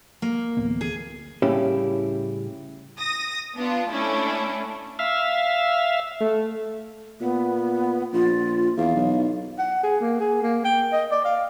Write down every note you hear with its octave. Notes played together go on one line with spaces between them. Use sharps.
A#3
D1 A1 B3
G#4
A2 C#3 G3 C#4 E4 G4
D#6 A#6
B3 D4 F4
A3 C#4 D4 E4
E5 F5
A3
A#2 B3
A#1 F4
E2 F5
B1
F#5
G#4
A#3
G#4
A#3
G5
D#5
D5
F5